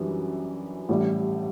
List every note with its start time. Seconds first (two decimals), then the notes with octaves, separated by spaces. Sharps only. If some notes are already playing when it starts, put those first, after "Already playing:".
Already playing: F#2 E3 G3 D4
0.89 A1 A2 G3